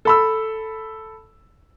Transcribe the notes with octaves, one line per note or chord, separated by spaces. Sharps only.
A4 B5 E6